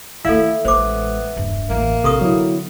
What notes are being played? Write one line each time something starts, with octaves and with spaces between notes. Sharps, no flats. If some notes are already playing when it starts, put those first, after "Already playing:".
D#3 A3 E4 A4 E5 F5
A1 G#3 B3 C5 D6
E1 G2
A1 E2 A#3
A#1 C3 A4 C#6 D#6
D3 F#3 B3 E4